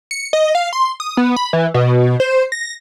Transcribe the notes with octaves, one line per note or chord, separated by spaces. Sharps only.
C#7
D#5
F5
C6
D#6
B3
B5
E3
B2
C5
A#6